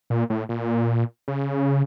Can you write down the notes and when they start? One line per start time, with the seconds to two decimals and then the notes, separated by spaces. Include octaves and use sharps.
0.10 A#2
0.30 A2
0.49 A#2
1.28 C#3